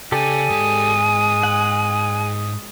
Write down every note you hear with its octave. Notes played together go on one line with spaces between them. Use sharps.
C#3 G4 A4 D5 G#5
G#2 G#3 A5 D#6
G#4 F#5